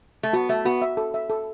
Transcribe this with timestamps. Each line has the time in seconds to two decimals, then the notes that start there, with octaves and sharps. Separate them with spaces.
0.23 A3
0.33 B3 F#4
0.49 A3 E5
0.65 B3 F#4
0.82 E5
0.97 A4
1.14 E5
1.30 A4